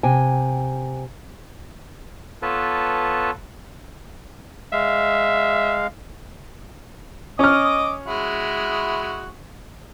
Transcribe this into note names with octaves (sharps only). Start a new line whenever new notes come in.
C3 G5 G#5
B3 F4 A4 B4 C#5 A5
G#3 E5 F5
C#4 D#5 D6 D#6 F6
G#3 E4 F#4